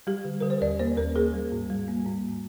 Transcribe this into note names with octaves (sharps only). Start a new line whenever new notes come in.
G3 G4
D3
D3 A#4
C5
D#2 D5
A#3 C5
D#2 A#4
A#3 G#4
G3
G#2
G3
A#3
G#2